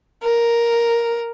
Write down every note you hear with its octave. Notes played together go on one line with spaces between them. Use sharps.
A#4